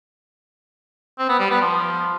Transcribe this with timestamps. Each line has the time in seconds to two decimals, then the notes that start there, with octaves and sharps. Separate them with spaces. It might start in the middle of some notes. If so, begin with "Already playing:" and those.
1.19 C4
1.29 B3
1.40 G3
1.50 B3
1.61 F3